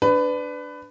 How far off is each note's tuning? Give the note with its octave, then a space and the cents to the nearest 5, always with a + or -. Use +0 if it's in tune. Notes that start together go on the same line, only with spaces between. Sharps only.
D4 +0 B4 +20